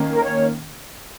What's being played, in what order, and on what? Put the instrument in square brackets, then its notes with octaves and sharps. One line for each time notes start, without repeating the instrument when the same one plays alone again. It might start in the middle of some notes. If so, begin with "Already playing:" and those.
Already playing: [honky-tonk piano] D#3 A#3 C#4
[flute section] A#4
C#5